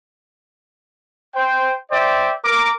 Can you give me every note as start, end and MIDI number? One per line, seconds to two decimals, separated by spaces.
1.35 1.74 72
1.35 1.74 79
1.92 2.33 72
1.92 2.33 74
1.92 2.33 76
1.92 2.33 79
2.45 2.70 70
2.45 2.70 86